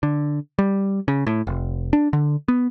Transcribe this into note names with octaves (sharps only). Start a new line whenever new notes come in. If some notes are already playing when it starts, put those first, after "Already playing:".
D3
G3
C#3
A2
F1
D4
D3
B3